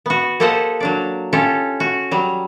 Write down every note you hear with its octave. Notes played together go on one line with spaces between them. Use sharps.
B3 F#4
A#3 G4 A4 C5 D#5 F#5
F#3 D4 D5
C#4 F4 G4 A4
F#4
F#3 G3